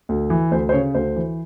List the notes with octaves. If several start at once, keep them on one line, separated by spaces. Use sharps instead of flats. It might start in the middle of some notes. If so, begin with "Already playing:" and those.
D2
E3
D2 C5
C5
C#3 C#5
D2 C5
E3